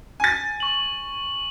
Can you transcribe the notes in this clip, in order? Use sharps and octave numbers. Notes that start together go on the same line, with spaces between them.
G#5 A6
C#6 F#7